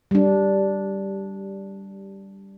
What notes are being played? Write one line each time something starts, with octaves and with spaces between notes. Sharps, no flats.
G3 D4